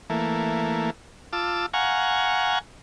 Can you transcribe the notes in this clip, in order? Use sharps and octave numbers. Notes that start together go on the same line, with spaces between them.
E3 A3 A#3
F4 A5 D6 E6
F5 F#5 G#5 A#5 C#6